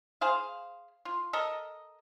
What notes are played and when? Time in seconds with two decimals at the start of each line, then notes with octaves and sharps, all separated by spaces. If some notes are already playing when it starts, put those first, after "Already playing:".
0.21 G#4 C5 F5
1.05 F4
1.33 A4 A#4 D#5